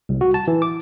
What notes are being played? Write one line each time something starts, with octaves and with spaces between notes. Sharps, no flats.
C2
F#4
A5
E3
D6